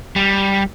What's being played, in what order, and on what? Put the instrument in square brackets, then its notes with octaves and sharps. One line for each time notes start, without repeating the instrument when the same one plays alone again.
[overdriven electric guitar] G3